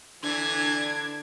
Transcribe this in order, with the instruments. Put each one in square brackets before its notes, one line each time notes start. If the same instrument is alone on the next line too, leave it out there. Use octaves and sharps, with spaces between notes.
[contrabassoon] D3 [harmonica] E3 [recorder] D4 [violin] G#6